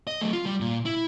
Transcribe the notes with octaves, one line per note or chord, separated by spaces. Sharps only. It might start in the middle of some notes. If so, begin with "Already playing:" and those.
D#5
F#3 A3
F4
G3
A#2
E4